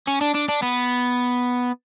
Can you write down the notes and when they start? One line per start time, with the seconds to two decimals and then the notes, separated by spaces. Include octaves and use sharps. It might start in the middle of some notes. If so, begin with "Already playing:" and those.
0.07 C#4
0.21 D4
0.34 D4
0.48 D4
0.62 B3